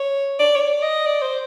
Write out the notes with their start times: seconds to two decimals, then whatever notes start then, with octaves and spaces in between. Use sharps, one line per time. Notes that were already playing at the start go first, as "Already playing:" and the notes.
Already playing: C#5
0.39 D5
0.55 C#5
0.61 D5
0.82 D#5
1.06 D5
1.22 C5